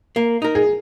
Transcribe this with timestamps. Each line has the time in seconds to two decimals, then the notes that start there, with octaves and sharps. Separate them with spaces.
0.16 A#3
0.42 D#4 A#4
0.55 G#4